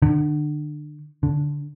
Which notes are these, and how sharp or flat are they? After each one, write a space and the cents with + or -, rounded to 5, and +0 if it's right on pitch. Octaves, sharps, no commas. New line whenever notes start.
D3 +30
D3 -10